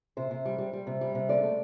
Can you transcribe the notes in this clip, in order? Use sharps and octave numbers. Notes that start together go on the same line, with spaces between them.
C3 C5
C3
G3
G3
G3
C3
G3
C3
D3 D5
A3